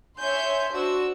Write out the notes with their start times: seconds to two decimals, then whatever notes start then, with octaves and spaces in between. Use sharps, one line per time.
0.19 C#5 E5 G#5 C6 G6
0.73 D4 F#4 C5 E6